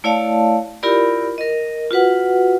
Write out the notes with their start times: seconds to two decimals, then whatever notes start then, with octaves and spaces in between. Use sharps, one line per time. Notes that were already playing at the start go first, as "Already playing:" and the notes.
0.04 A3 E4 C#5 D5 F5 A5
0.83 E4 F4 G4 A#4 D5 B5
1.38 A#4 D#5
1.91 F4 F#4 B4 F#5